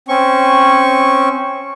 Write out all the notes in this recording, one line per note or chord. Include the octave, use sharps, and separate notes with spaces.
C4 C#4 C#6